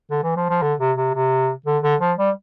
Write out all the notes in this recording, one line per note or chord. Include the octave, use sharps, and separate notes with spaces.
D3
E3
F3
F3
D3
C3
C3
C3
D3
D3
F3
G3